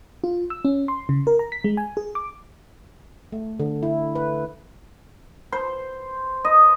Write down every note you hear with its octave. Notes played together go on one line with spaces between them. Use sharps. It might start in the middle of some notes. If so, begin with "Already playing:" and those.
F4
E6
C#4
C6
C#3
A#4
A#5
B6
G#3
G#5
G#4
D6
A3
D3
E4
B4
C5
D#5